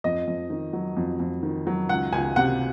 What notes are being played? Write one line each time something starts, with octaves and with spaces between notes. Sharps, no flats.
F2 D#5
F2
D#3
F#3
F2
F2
D#3
F#3
C#2 F#5
C#2 G#5
C3 F#5